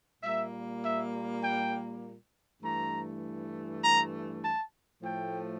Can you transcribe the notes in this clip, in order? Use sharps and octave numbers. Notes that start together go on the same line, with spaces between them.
A#2 G3 A#3 E5
E5
G5
G2 E3 A3 A#5
A#5
A5
A2 F3 A3 G5